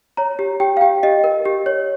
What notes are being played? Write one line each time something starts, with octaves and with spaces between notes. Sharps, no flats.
C#5 A#5
G4
G4 G5
F5
G4 G5
G4 D#5
A#4
G4
C#5